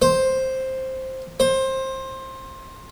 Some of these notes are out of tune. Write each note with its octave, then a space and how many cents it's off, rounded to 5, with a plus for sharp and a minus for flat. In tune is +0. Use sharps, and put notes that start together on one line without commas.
C5 +5
C5 +20